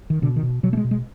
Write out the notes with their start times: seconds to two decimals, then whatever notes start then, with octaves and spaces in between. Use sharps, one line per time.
0.10 D#3
0.22 B2 D3
0.36 D#3
0.43 B2
0.63 B2 F#3
0.73 A3
0.77 G#3
0.84 B2
0.91 G#3